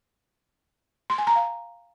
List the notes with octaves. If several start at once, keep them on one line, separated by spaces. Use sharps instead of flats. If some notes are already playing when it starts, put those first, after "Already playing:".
C6
G#5
A#5
F5